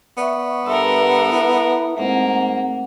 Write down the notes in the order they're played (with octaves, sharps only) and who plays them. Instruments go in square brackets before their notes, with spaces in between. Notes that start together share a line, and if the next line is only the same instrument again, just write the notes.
[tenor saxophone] B3 [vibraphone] D5 E5 C#6
[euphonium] G2 [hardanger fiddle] A4 A#4 [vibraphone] E5 C6 E6
[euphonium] E4
[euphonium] G#2 [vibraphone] A3 C4 F#5 [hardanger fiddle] A#3